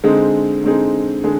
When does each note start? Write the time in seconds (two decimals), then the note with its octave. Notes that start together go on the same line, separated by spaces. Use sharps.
0.04 D3 G#3 C4 D#4 G#4
0.64 D3 G#3 C4 D#4 G#4
1.24 D3 G#3 G#4